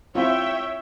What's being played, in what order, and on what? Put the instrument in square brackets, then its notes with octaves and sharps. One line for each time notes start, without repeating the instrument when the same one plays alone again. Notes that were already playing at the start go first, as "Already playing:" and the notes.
[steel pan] C4 E4 F4 [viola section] C#5 E5 G5